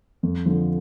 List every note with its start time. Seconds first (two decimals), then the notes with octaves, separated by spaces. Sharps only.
0.23 F2
0.46 D3 F3